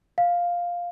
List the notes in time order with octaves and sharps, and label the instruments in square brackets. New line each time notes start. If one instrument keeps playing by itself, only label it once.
[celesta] F5